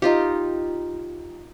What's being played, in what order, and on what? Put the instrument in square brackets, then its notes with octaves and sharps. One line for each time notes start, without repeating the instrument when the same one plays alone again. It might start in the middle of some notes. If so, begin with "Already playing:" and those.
[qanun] D#4 F4 G4